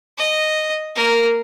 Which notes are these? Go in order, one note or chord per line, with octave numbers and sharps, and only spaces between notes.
D#5
A#3 A#4